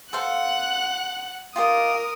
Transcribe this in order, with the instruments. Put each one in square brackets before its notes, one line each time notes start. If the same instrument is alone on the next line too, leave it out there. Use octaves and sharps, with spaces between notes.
[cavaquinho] A4 C5 F5 [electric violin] F#5 F#6
[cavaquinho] F4 G4 D#5 [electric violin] A#4 D#6